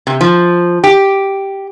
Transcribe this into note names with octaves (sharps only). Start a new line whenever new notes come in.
C3
F3
G4